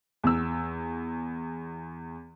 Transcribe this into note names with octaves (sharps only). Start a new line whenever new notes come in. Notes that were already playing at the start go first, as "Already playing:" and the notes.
E2 E6